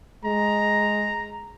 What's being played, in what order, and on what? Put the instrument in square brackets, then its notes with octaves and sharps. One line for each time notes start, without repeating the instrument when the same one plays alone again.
[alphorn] G#3 [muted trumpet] A#5